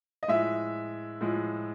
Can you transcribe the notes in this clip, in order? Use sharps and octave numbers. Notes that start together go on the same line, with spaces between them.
D#5
A2 F3 G#3 E5
A2 F3 G#3